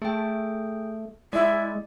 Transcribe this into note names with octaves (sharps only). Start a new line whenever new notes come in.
A3 G#4 G5
G#3 E4 D5